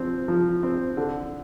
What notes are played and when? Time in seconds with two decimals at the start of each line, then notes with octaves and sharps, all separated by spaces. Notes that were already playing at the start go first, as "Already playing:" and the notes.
Already playing: F3 C4
0.28 F3
0.63 C4
0.97 D3